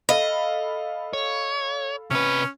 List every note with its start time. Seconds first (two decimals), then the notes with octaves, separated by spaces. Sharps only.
0.09 A4 D#5 F5 B5
1.13 C#5
2.11 C3 C#4 B4